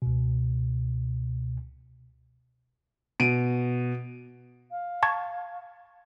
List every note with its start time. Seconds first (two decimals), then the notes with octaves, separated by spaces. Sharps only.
0.02 C#2 B2
3.20 B2 D7 D#7
4.71 F5
5.03 A5 C#6 G#6